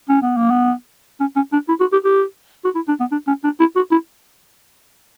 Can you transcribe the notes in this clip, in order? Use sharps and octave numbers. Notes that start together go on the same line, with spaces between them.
C#4
B3
A#3
B3
C#4
C#4
D4
E4
F#4
G4
G4
F#4
E4
D4
B3
D4
C#4
D4
E4
F#4
E4